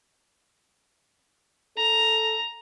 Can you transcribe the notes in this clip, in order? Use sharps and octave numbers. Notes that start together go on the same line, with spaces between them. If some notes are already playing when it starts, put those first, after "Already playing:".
A4 A#5